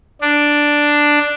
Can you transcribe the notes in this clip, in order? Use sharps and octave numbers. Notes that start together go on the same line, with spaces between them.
D4